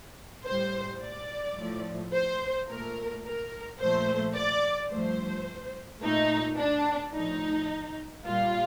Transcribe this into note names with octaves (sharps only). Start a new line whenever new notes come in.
A2 G3 C5
D5
A2 F3 A3
C5
A#2 A3 A#4
A#4
A#2 F3 A3 C5
D5
G2 F3 A3 C5
A#2 A3 D#4
D4
A2 F3 A3 D#4
A#2 G3 F4